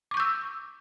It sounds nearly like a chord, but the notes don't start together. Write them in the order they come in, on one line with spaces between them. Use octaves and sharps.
D6 C#6 G6 E6